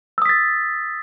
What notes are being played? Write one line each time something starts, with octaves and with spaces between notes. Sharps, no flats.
D#6 E6 A6 B6